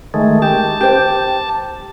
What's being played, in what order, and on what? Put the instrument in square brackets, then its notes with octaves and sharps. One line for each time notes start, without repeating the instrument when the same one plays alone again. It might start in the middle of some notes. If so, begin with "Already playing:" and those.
[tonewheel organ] D#3 G#3 A3
[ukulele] G4 [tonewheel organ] A5
[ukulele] G4 C5 G5